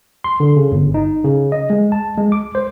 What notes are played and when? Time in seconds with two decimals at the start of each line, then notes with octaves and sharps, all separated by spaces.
0.24 C6
0.40 D3
0.56 C#3
0.72 G1
0.94 D#4
1.24 C#3
1.52 D#5
1.70 G#3
1.92 A5
2.18 G#3
2.32 D6
2.55 C5